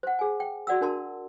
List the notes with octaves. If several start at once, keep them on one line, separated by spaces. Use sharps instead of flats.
C5 F#5
G#4 G#5
G5
F#4 D5 F#5 E6
D4 A#4 A5 C6